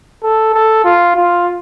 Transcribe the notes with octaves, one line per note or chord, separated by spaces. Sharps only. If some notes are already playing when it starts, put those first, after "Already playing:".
A4
A4
F4
F4